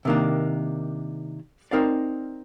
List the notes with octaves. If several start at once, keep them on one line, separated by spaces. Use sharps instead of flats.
C3 D#3 A#3 D4
C4 D#4 A#4 D5 F5